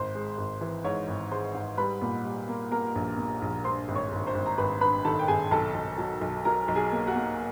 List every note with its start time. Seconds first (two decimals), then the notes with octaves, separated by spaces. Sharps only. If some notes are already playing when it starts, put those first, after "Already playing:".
Already playing: G#1 C5 C6
0.15 G#3
0.38 G#1
0.61 E3
0.84 G#2 C#5 C#6
1.08 G#1
1.31 G#3 C5 C6
1.54 G#2
1.77 G3 B4 B5
2.01 A#2
2.24 G3
2.48 A#3
2.71 A#3 A#4 A#5
2.95 A#1
3.17 A#2
3.42 A#1
3.64 G2 C5 C6
3.88 G#1
3.95 C#5 C#6
4.12 G#1
4.27 C5 C6
4.35 G#1
4.46 A#5
4.58 G#1 B4 B5
4.81 G2 B4 B5
5.05 D#3 A4 A5
5.19 G5
5.28 G#1 G#4 G#5
5.51 B1 A4 A5
5.74 B1
5.98 F#3
6.21 B1
6.45 F#3 A#4 A#5
6.68 B1
6.76 G#4 G#5
6.92 A#3
7.07 F#4 F#5
7.15 A#3